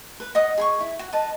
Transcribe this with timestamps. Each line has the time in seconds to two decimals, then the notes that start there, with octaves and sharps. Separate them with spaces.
0.20 B4
0.35 D#5 F#5 D#6
0.58 G#4 B5 C#6
0.80 E4
0.99 F#4
1.13 B4 D#5 A5